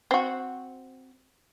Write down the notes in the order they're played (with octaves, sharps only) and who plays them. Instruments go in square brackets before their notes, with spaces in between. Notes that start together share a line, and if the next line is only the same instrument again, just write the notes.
[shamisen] C4 F#4